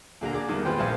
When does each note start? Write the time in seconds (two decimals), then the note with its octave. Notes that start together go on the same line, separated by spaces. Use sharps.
0.21 A#2 D3 A#3 A#5
0.33 G#4 D5
0.48 E2 D#3 G3
0.65 A#2 G#3 F4 B4 C5 G5
0.79 A#1 C4 F5 G#5 A5